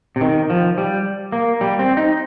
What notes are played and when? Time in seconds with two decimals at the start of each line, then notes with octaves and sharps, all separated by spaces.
0.16 C3
0.21 D#3
0.50 F3
0.78 G3
1.32 A#3
1.61 G3
1.79 C4
1.97 D#4